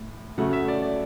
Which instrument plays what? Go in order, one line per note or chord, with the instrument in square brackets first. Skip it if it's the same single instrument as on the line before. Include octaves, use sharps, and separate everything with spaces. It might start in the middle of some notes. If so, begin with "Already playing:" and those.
Already playing: [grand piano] A2
C#3 F#3 A3 F#5
E5
D5
D5